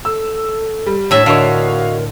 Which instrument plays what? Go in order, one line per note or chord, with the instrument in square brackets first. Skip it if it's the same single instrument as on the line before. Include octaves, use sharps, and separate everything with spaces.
[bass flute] A4 [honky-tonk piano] E6
[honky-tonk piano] G3
[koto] A2 E5 [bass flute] D4 [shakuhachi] C#5
[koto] D3 [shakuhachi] F#4 [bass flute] A#4 [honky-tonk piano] C#5 D#5 F5